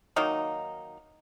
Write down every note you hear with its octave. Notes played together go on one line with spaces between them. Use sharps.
D#3 F#3 A#3 D#4